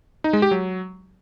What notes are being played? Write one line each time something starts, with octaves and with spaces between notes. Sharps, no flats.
D#4
G#3
G4
F#3